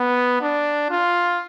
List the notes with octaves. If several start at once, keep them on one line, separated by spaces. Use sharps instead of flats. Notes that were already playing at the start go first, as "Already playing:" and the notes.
Already playing: B3
D4
F4